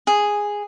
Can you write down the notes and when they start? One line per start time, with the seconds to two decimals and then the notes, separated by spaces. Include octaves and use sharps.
0.07 G#4